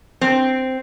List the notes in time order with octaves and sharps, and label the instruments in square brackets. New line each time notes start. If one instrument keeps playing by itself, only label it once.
[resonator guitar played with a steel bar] C4